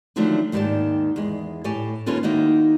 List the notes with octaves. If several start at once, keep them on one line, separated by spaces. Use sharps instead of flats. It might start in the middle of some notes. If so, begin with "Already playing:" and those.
D3 D#3 F3 F#3 A3 D4
D#2 G#2 D#3 G4 D5 A5
E2 G#3
A2 G4 C#5 G#5 A5
D#2 A#3 C#4 F4 A4 B4
D#3 A#3 D#4 E4 F#4